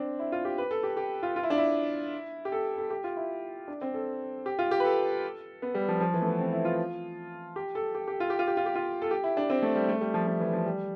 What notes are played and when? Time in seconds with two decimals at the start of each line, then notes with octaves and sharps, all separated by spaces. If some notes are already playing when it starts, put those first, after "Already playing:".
Already playing: C4 D4
0.19 E4
0.32 F4
0.45 G4
0.58 B4
0.71 A4
0.83 G4
0.97 G4
1.23 F4
1.36 F4
1.43 E4
1.50 D4
1.58 E4
2.45 G4
2.52 A4
2.78 A4
2.90 G4
3.04 F4
3.17 E4
3.68 D4
3.81 C4
3.94 A4
4.46 G4
4.59 F4
4.71 G4
4.80 B4
4.84 A4
5.62 B3
5.75 G3
5.88 F3
6.00 F3
6.14 E3
6.22 A3
6.27 B3
6.39 C4
6.52 E4
6.65 F4
7.56 G4
7.75 A4
7.95 G4
8.08 G4
8.20 F4
8.30 G4
8.39 F4
8.47 G4
8.57 F4
8.66 G4
8.75 F4
9.02 A4
9.11 G4
9.24 E4
9.37 D4
9.50 C4
9.62 A3
9.75 G3
9.89 A3
10.01 G3
10.14 F3
10.27 F3
10.40 E3
10.53 F3
10.66 G3